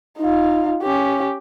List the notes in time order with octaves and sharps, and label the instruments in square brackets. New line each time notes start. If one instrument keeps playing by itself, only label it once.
[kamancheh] D#4 F4
C#4 G4